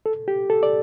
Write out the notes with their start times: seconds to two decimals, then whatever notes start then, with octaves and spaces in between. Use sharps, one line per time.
0.06 A4
0.28 G4
0.50 A4
0.63 D5